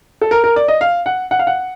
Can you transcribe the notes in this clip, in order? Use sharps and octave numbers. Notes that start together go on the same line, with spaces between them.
A4
A#4
A#4
D5
D#5
F5
F#5
F#5
F5
F#5